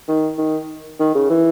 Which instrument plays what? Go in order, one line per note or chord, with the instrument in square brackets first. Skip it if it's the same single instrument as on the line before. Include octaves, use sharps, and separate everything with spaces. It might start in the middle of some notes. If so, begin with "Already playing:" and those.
[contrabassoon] D#3
D#3
D#3
C#3
E3